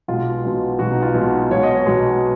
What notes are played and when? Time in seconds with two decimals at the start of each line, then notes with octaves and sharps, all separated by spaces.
0.08 B1 B2 G#3 F4
0.44 B1 B2 G#3
0.79 B1 B2 G#3 F#4
0.92 D#4
1.02 F4
1.15 B1 B2 G#3
1.51 B1 B2 G#3 C#5
1.63 D#5
1.75 C#5
1.86 B1 B2 G#3